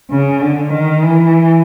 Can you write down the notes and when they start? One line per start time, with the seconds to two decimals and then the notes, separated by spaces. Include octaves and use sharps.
0.10 C#3
0.41 D3
0.72 D#3
1.03 E3